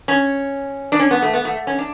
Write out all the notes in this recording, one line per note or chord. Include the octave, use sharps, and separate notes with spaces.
C#4
D4
C#4
B3
A3
B3
A3
C#4
D4